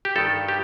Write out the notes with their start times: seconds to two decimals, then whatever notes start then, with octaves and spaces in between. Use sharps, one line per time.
0.05 G4
0.16 G2 D#3 A4
0.48 G4